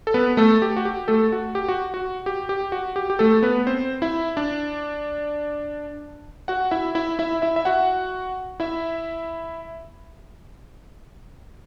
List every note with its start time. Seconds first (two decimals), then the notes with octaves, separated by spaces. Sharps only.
0.07 A4
0.14 B3 B4
0.37 A3 A4
0.62 G4
0.77 F#4
0.85 G4
1.08 A3 A4
1.32 F#4
1.55 G4
1.68 F#4
1.94 F#4
2.26 G4
2.49 G4
2.72 F#4
2.96 G4
3.10 G4
3.19 A3 A4
3.43 B3 B4
3.67 C4 C5
4.02 E4 E5
4.37 D4 D5
6.48 F#4 F#5
6.71 E4 E5
6.95 E4 E5
7.19 E4 E5
7.42 E4 E5
7.56 E5
7.65 F#4 F#5
8.60 E4 E5